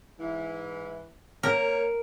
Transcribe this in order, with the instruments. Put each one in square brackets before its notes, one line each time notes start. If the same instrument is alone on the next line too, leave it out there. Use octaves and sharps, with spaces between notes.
[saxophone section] G#2 E3
[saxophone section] A#3 C#5 [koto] A#4